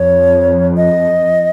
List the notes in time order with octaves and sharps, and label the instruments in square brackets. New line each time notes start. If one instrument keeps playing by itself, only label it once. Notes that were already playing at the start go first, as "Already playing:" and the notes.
Already playing: [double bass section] F2 [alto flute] C#5
[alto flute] D#5